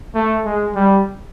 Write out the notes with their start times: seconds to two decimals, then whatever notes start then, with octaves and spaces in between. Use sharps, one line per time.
0.15 A3
0.45 G#3
0.75 G3